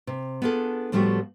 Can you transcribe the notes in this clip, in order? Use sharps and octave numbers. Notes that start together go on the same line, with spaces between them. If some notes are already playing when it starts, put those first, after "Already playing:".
C3
B3 D4 F4 G#4 A4
A2 F3 G3 A3 B3 F#4